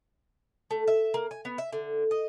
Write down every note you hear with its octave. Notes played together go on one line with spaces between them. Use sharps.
A3
E5
A#3
G#5
B3
E5
D3
D#5